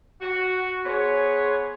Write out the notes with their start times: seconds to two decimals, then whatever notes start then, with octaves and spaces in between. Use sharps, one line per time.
0.22 F#4
0.86 B3 G#4 C5 C#5